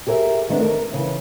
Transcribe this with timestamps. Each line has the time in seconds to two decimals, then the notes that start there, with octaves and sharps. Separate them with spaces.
0.07 G4 G#4 A#4 C5 E5
0.49 D#3 A3 B3 C4 D4
0.61 A#4
0.93 C#3 E3